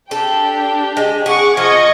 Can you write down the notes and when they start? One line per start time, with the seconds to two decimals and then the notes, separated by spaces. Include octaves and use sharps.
0.11 D4 G4 A4 G5
0.97 G#3
1.26 G#4 F#5 C#6 D6
1.57 F3 D#5 C#6 G#6